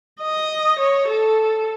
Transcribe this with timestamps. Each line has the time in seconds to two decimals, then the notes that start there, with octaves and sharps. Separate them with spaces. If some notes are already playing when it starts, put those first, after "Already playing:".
0.22 D#5
0.79 C#5
1.08 A4